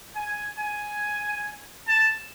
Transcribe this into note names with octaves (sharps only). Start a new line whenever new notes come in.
G#5
G#5
A5